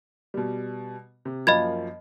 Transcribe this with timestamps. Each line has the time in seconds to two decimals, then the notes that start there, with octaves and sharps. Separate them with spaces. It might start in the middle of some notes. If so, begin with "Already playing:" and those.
0.34 B2 G3
1.25 C3
1.47 F#2 F3 A#3 D#5 B5 G#6